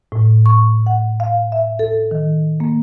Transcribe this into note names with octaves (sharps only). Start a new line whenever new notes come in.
A2
C#6
F#5
F5
E5
A4
D#3
A#3